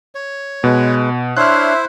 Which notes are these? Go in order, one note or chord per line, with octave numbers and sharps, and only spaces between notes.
C#5
B2 G#3 B4
D4 E4 C5 C#5 E5 C6 F6 F#6